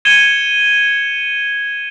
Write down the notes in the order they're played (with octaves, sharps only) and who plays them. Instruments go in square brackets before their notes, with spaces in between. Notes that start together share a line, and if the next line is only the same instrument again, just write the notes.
[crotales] G#6 C#7 D#7 E7 G7